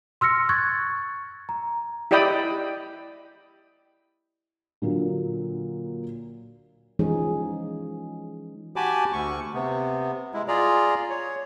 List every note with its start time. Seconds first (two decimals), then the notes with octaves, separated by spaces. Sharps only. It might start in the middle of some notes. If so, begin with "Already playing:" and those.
0.21 C6 E6 F6 A#6 C#7
0.49 C#6 F#6 G#6 A6
1.49 A#5
2.11 E4 G4 D5 D#5 G5 B5
4.82 A#2 D3 F#3 A#3
6.99 E3 F3 G#3 C#4 D#4 G#4
8.76 F#4 G4 G#5 A5 B5 D6
9.13 D2 C#6
9.54 C3 B3
10.34 G#3 E4
10.48 F4 G#4 D5 A#5
11.10 C#5